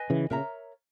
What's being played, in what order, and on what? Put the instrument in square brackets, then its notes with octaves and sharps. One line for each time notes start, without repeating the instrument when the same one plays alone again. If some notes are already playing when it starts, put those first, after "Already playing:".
Already playing: [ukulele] B4 D#5 G#5
[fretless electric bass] C#3 E3
[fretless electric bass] A#2 C#3 [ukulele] A#4 C#5 E5 A#5